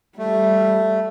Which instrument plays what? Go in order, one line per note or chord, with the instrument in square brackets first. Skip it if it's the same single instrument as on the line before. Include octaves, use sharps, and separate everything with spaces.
[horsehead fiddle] G3 [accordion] A3